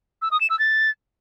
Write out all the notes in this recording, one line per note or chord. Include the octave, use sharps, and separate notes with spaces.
E6
D#6
E7
E6
A6